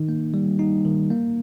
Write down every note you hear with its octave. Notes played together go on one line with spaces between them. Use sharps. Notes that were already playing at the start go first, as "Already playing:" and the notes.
Already playing: D#3 D#4
A#3
G3
D#4
D#3
A#3